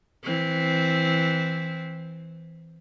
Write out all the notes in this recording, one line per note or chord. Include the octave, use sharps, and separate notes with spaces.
E3 C4